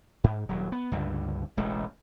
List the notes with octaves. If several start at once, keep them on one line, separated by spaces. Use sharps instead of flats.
G#2
D#1 F#3
B3
C#2 G2 D3
E1 A1 G#3 A3